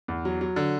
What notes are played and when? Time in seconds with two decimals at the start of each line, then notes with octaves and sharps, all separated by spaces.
0.08 E2
0.25 F#3
0.41 F#3
0.56 D3